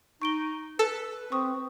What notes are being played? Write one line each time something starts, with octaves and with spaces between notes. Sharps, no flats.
D#4 C#6 D7 G7
A4 B4
C4 C#6 D#6